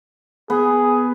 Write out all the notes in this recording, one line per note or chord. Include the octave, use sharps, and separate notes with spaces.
B3 G#4